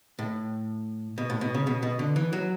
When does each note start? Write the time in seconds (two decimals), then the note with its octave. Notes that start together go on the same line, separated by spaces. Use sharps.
0.19 A2
1.18 B2
1.30 A2
1.41 B2
1.55 C#3
1.67 B2
1.83 B2
1.99 D3
2.16 E3
2.33 F#3